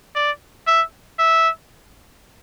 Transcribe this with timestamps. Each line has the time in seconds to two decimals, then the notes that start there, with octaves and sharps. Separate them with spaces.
0.15 D5
0.67 E5
1.19 E5